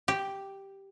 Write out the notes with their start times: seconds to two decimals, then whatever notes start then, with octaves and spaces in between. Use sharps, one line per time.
0.08 G4